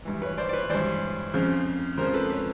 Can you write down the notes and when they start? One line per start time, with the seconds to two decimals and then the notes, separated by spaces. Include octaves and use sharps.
0.05 G2 E3
0.22 B4 C#5
0.38 C5 D5
0.49 D5
0.53 B4 C#5
0.69 G2 E3 C5 D5
1.34 F2 C#3 F3
1.98 F2 C#3 F3 A#4 C5
2.14 A4 B4
2.30 B4 C#5